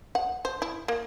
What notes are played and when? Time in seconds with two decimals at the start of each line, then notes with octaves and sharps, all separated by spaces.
0.15 F#5
0.45 C5
0.62 E4
0.88 A#3